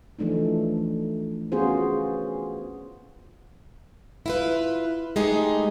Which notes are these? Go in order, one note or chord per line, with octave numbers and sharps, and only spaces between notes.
E3 F3 A3 D4 D#4
B3 C#4 F4 F#4 G#4 C5
E4 F4 B4
G#3 A3 D#4 G4 G#4